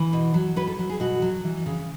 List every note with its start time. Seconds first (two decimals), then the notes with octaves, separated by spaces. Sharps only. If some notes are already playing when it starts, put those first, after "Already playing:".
Already playing: E3
0.13 B2
0.34 F#3
0.56 F#3 B4
0.67 A4
0.79 F#3
0.90 G#4
1.00 B2 F#4
1.22 F#3
1.44 E3
1.66 C#3